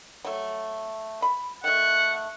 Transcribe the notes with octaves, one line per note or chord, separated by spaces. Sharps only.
F#3 A3
B5
D#3 A3 F#5